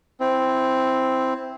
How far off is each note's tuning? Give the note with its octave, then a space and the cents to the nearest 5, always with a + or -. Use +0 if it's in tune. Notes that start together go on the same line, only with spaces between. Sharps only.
C4 +0 E4 +0